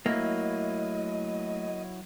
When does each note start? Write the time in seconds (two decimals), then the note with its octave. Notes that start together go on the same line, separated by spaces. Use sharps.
0.06 F#3 A3 A#3 E4 D#5